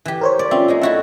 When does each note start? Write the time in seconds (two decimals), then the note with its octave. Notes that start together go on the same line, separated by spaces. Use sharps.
0.05 E3 G4
0.21 A#4 C5 C#5
0.39 D5
0.51 C4 C#4 F4 E5
0.68 G#3 A#3 D#4
0.81 E4 F#4 A4